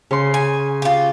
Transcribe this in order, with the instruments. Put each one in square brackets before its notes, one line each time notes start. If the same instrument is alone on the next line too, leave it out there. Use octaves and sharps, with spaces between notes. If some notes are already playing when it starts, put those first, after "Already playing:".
[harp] C#3 C6
[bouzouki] G#5
F4 G4